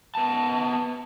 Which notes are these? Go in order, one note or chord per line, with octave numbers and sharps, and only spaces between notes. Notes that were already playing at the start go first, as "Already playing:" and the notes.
B3 A5